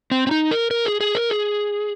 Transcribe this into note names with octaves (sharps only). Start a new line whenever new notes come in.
C4
C4
D#4
A#4
A#4
G#4
G#4
A#4
G#4